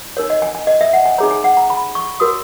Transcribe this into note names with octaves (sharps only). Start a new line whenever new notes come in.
D#4 A#4 C#5
D#5
G#5
G#5
D#5
E5
F#5
G#5
D#4 G#4 C#5 A#5
G#5
F#5
A#5
B5
C#6
F#4 A#4 C#5 D#6